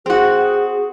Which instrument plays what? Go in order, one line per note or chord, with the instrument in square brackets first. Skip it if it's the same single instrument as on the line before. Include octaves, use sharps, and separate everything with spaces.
[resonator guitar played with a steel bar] C4 F#4 [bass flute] G#4